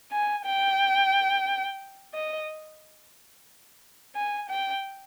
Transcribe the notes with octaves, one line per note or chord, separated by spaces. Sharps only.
G#5
G5
D#5
G#5
G5